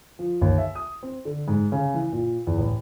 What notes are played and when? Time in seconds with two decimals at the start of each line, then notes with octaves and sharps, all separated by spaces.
0.19 F3
0.41 D#2
0.58 E5
0.75 D#6
1.03 C4
1.25 D3
1.48 G#2
1.72 C#3
1.94 E3
2.12 A#2
2.47 E2
2.58 A1